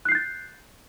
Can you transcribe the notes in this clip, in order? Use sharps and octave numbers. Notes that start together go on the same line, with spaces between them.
F#6 G6 A6 C7